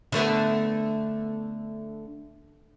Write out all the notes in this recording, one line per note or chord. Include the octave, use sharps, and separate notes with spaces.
D3 A3 B3